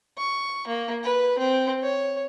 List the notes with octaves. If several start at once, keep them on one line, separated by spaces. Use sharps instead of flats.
C#6
A#3
B4
C4
C#5